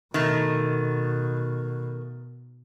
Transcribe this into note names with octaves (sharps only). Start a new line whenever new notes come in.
B2 D#3 A3